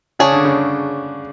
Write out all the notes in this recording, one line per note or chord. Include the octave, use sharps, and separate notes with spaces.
C#3 D4 G#4 C#5
D3
C#3